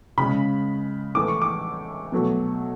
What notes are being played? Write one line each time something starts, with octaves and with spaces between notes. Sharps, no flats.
C#3 G#3 B5
A2 E3 A3 D6
C#6
D6
B2 F#3 A3